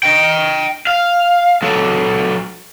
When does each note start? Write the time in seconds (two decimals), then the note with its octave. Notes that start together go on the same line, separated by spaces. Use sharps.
0.03 D#5 G5
0.87 F5
1.62 F#3 A4